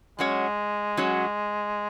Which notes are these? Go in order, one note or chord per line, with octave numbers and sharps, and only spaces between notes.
F#3 G#3 C#4 F#4 C#5
F#3 C#4 F#4 C#5